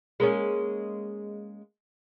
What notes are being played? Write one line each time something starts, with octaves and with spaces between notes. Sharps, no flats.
G#3 A#3 C#4